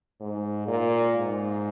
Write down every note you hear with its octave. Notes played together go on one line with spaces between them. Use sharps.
G#2
A#2
G#2